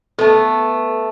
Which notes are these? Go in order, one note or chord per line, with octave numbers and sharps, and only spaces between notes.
A3 B3 A4